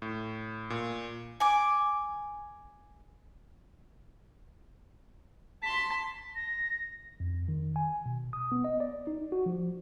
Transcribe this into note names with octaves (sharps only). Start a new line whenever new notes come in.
A2
A#2
G#5 D6
A5 C6 B6
A#6
F2
D#3
G#5
B2
D#6
B3
D#5
D5
D#4
F#4
F3